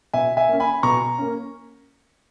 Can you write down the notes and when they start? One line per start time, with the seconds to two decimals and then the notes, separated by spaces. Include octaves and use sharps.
0.13 B2 E5 G#5
0.37 E5 G#5
0.49 A#3 C#4
0.60 G#5 B5
0.83 B2 A#5 C#6
1.18 A#3 C#4